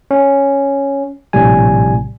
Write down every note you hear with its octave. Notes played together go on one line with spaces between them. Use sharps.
C#4
A#1 A2 C3 G3 G#5